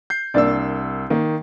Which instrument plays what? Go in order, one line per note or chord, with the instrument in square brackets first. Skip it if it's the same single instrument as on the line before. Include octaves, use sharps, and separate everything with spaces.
[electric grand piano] G6 C7
[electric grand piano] C2 E6 [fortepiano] A#3 D4 D5
[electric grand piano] D#3 [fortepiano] A#3